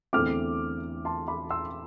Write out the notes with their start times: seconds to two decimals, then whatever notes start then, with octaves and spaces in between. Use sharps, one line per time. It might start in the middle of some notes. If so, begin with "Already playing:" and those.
0.13 E2 D3 A3 C4 D6 F6
1.05 A5 C6
1.28 B5 D6
1.50 C6 E6